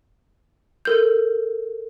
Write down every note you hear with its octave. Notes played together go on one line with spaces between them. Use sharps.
A4 A#4 G6